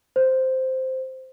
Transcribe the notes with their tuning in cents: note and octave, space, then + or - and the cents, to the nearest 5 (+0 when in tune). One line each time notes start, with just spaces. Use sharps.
C5 -5